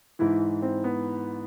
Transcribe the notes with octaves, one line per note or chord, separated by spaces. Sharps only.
G#2 E3 E4
C4
B3